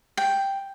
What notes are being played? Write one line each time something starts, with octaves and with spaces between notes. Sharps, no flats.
G5